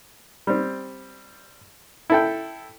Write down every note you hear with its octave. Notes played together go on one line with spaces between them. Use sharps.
G3 C4
E4 A4 G5